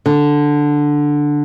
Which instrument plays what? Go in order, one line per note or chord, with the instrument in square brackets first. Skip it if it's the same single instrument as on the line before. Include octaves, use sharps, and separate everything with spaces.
[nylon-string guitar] D3